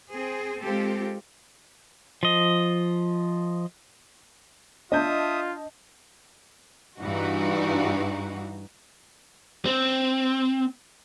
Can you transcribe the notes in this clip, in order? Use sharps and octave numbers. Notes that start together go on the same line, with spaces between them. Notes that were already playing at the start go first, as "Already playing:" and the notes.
C4 G#4
G#3 C4 F4 G4 A4
F3 D#5
D4 F4 D#5 E5 A5 D#6 G6
G2 E3 D#4 F#4
C4